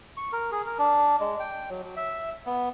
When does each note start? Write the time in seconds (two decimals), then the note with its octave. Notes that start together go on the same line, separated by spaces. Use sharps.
0.17 C#6
0.33 A#4
0.52 G#4
0.66 A#4
0.79 D4
1.20 G#3
1.40 G5
1.70 F#3
1.84 F#3
1.97 E5
2.46 B3